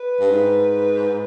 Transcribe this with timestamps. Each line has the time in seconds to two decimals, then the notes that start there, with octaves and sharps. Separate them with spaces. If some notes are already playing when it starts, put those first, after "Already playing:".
Already playing: B4
0.20 G2
0.31 G#2